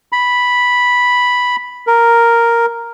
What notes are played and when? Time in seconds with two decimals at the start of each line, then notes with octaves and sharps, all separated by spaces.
0.12 B5
1.87 A#4